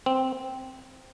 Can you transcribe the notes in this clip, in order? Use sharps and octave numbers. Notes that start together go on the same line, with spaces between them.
C4